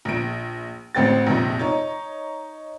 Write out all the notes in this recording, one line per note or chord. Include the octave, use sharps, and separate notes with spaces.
A#1 D7
A1 C4 G5 A6
A#1 F2 C3
D#4 C#5